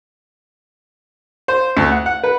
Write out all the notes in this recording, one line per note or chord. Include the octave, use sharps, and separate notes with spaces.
C5
D2
F#5
F#5
B4